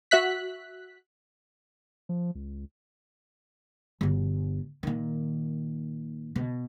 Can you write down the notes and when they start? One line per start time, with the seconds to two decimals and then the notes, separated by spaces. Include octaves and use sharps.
0.11 F#4 E5 F#6 B6
2.09 F3
2.35 C#2
4.01 G1 B2
4.83 A#2 D#3
6.36 B2